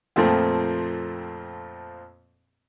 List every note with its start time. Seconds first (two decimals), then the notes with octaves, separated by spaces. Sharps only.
0.16 F2 A#2 F3 A3 C4